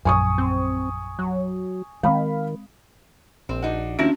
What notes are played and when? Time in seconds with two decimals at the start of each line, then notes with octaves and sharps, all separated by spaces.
0.05 A#1 F#2 G#5 C#6 D#6
0.38 C4
1.19 F#3
2.03 D#3 G#3 C4 F5 B5
3.49 A#1 C4
3.62 D4 D#4 F#4
3.99 D#2 F3 C#4 D4 E4 F#4